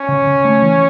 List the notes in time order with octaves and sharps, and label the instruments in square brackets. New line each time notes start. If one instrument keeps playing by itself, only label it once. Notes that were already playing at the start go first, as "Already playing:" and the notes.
Already playing: [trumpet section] C#4
[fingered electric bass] C#3
C#3
A3
E3